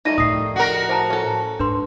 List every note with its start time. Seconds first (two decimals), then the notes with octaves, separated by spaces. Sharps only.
0.05 D#3 G3 A3 D#4 A#6 D#7
0.18 A2 F3 D#6 A#6 C7
0.56 F#4 A#4
0.89 E3 C5 A5 A#5
1.10 C#4 A4
1.59 G#2 D4 B4 C6